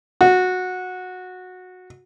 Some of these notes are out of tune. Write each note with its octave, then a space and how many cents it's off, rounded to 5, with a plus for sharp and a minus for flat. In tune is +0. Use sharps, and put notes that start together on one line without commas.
F#4 -15